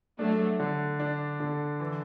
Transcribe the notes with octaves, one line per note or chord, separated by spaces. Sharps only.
F#3 A3 D4
D3
D4
D3
E3